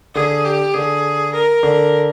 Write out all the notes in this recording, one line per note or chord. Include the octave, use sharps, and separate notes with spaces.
D3 G#4
G4
D3 G#4
A#4
D3